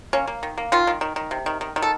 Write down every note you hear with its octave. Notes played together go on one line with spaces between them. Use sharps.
A#3 C#4
A#3
D#3
A#3
D#3 F4
D#3
D#3
D#3
C3
D#3
D#3
D#3
A4